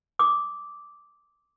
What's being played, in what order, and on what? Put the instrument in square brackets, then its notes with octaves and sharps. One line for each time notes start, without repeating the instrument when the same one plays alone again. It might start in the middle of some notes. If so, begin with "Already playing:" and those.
[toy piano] D6 D#6